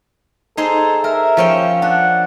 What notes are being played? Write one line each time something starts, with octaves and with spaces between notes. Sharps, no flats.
D#4 G#4 A4 C5
A#4 E5
F3 C#4 G5
D4 F#5